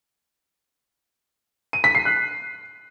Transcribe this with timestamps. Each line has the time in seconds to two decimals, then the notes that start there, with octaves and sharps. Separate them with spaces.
1.73 D#7
1.84 B6
1.95 C7
2.05 F#6